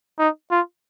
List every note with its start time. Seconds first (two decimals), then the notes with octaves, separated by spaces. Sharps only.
0.19 D#4
0.51 F4